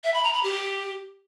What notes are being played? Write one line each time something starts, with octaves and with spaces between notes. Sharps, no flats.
E5
B5
A#5
B5
G4